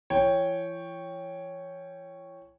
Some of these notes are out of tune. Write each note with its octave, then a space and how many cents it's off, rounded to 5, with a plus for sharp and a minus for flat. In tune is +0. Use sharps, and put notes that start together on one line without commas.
E3 +40 C#5 +0 G5 +0